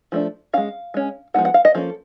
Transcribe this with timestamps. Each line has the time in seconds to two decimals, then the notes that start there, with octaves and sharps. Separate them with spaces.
0.12 F3 A3 D4
0.53 G#3 C#4 F5
0.94 G#3 C#4
1.34 F3 G#3 B3 D#4 F#5
1.45 F#5
1.54 F5
1.65 D#5
1.75 F3 A#3 C#4 A4